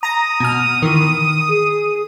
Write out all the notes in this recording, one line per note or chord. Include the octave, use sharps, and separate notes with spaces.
A#5 D#6 A#6
B2 F6
D#3 E3
G#4